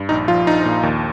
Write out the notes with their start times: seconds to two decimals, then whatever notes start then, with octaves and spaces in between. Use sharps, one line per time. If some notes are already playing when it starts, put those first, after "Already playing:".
Already playing: G2
0.09 A#1 D#4
0.28 F3 F4
0.47 A#1 D#4
0.65 A#2
0.83 D#2